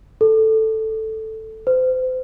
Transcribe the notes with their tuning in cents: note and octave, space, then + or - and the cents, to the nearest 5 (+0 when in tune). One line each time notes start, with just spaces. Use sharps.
A4 +0
C5 -35